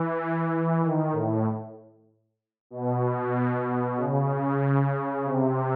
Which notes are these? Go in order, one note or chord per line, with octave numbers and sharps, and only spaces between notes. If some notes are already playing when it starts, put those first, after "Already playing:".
Already playing: E3
D#3
A2
B2
C#3
C3